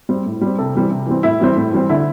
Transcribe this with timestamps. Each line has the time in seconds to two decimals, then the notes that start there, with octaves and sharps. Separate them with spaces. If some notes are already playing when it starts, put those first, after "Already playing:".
0.09 G3 C4
0.26 A2
0.41 G3 C4
0.58 C3 A4
0.75 E3 G3 C4
0.91 C3
1.07 E3 G3 C4
1.23 A2 E4
1.40 E3 G3 C4
1.56 A2
1.72 E3 G3 C4
1.89 D3 E4